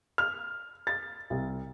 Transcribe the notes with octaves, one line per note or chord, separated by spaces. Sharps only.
F6
A6
C2